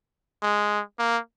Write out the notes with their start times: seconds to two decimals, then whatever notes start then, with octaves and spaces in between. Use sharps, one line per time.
0.43 G#3
0.99 A#3